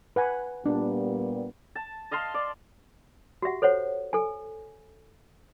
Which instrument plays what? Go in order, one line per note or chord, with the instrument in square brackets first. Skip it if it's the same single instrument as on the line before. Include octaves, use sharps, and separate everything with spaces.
[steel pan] B4 F#5 G#5
[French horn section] A#2 G3 B3 [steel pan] D4
[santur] A5
D#5 F5 A5 C6
D5
[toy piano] F#4 G4 E5 F#5
A4 C5 C#5 F#5
A4 G#5